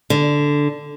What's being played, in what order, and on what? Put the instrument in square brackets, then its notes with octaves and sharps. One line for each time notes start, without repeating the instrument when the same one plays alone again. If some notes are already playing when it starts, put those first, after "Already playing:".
[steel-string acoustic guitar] D3